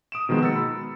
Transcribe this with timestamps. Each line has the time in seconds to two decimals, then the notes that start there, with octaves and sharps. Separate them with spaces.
0.12 D#6 D7 E7
0.29 B2 D#3 F3 G#3 A#3 B3
0.41 A#5 E6 A6 C#7
0.55 B5